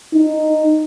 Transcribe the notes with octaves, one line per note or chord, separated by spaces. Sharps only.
D#4